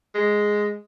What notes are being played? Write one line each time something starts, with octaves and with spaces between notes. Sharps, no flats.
G#3